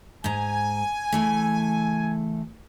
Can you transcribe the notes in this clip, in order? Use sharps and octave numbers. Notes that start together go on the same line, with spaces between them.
G#2 G#5 A#5
C#3 E3 A3